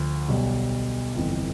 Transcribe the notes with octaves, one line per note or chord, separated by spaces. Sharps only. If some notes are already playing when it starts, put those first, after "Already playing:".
Already playing: D2 D3 F3
B1 B2 G3
G1 F2 E3